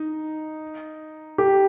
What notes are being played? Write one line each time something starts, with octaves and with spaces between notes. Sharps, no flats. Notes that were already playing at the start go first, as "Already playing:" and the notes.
Already playing: D#4
G4